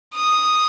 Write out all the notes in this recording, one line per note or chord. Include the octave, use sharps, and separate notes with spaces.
D#6